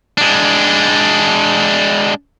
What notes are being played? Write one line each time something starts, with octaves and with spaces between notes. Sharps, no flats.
G#3 D4